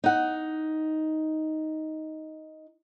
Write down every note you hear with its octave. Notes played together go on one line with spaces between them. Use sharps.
D#4 F#5